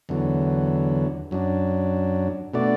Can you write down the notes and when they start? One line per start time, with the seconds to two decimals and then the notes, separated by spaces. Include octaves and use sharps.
0.09 E2 D3 F#3
1.31 F#2 F#3 D4
2.53 B2 A3 D4 F#4 D5